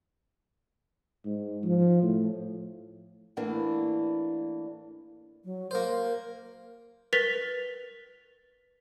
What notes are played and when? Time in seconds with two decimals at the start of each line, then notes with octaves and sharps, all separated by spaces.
1.25 G#2
1.64 F3
2.02 A2
3.37 A2 E3 A#3 D4
5.45 F#3
5.71 A#3 A#4 C5
7.13 A#4 B4 A6 B6 F7 G7